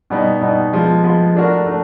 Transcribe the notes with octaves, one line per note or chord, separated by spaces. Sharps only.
B2 G3 B3 D#4
B2 G3 B3 D#4
F3 G#3 B3
F3 G#3 B3
A3 D4 F#4 A#4
A3 D4